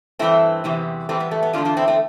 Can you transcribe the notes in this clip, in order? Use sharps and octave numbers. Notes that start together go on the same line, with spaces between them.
G2 E3 A3 C4 E4
E2 C3 E3 G3
A2 E3 G3 A3 C4
B3
A3
B3
E2 D3 A3 D4 F4
D4 F4
C4 E4
A3 C4